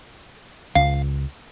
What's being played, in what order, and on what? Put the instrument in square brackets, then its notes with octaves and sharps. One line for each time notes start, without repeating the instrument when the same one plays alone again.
[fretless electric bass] C#2 [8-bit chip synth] F5